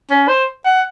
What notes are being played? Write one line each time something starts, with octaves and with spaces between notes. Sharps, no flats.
C#4
C5
F#5